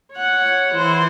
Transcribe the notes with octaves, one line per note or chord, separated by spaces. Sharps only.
C#5 F#5
E3 C5